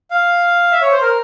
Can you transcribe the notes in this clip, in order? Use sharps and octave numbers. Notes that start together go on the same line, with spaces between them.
F5
E5
C#5
C5
A#4